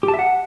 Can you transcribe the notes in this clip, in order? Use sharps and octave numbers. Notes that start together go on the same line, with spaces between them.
G4
A5
E5
F#5